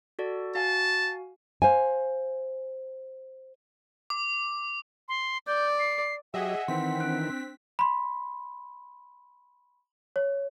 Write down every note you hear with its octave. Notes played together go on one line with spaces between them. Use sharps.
F#4 A4 D5
F#4 F5 G#5 A5
C5 F5 G#5
D6
C6
D5 G6
C7
F#3 G4 G#4 D#5 E5 F#5
D#3 E3 C4 C6 B6
D4 F#6 D7
B5 C6
C#5